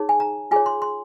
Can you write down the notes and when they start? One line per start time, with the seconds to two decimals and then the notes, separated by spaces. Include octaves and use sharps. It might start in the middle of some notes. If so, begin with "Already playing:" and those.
Already playing: D#4 G#4 C#5
0.09 G#5
0.20 A#5
0.51 F4 G#4 C#5 G#5
0.66 C6
0.82 C6